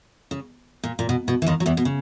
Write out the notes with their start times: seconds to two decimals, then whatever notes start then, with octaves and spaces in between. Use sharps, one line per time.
0.31 C#3
0.84 A#2
0.99 A#2
1.09 B2
1.28 B2
1.42 E3
1.46 D#2 D#3
1.60 F#3
1.66 E2 E3
1.77 B2
1.85 C#3